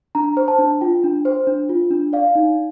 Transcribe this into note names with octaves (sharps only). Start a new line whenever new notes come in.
D4 A#5
C5
A5
D4
F4 G5
D4
C5
D4
F4
D4
D5 F5
D#4